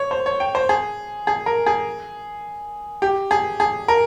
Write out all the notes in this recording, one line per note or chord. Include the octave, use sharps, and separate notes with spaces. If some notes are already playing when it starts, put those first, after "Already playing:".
Already playing: C#5
C5
C#5
G5
C5
G#4
G#4
A#4
G#4
G4
G#4
G#4
A#4